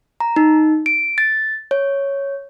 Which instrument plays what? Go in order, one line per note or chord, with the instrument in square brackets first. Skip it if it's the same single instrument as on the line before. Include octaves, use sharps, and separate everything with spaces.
[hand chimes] A#5
D#4
D7
A6
C#5